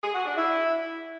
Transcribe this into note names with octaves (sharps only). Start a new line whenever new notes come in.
G#4
F#4
D4
E4